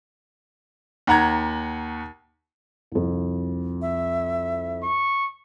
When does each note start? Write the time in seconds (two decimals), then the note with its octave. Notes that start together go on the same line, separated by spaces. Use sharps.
1.07 D#2 F#5 A#5 G#6
2.92 C2 F2
3.82 E5
4.83 C#6